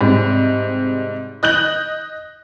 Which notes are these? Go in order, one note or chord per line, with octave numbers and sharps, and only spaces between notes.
G#2 C3 G3
D#5 F#6 G6 F#7